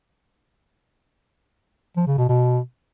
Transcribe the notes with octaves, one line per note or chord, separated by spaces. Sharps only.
F3
C#3
B2
B2